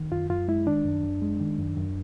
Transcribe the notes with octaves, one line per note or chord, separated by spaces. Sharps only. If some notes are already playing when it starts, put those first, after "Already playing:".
Already playing: D#3
F#2 F4
F#2 F4
G#3 E4
D#3 D4
F#2
F#2
G#3
D#3
F#2
F#2